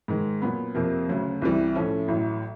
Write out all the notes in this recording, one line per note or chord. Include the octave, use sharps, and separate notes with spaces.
G#2 D#3 G#3
A#2 F#3 B3
F2 C3 F3 A#3
D2 C#3 F#3
C2 C3 E3 G3
A2 F3 A3 C#4
A1 A2 F#3